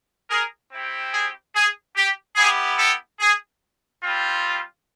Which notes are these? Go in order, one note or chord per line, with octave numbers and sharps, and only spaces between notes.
G#4 A#4
C4 E4 G4
G#4
G#4
G4
B3 E4 G4 G#4
G4 A4
G#4
G3 C4 F4